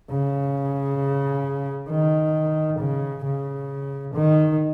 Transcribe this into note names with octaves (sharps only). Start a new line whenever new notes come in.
C#3
D#3
C#3
C#3
D#3